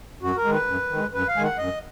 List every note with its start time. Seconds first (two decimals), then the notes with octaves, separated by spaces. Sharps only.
0.22 F#2 F#4
0.37 A#4
0.44 D#3 G#3
0.52 B4
0.67 F#2
0.90 D#3 G#3
1.13 F#2 B4
1.28 F5
1.36 D#3 G#3 G#5
1.44 F#5
1.58 F#2 D#5